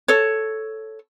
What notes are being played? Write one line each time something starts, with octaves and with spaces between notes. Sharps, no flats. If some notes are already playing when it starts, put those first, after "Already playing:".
A4 C#5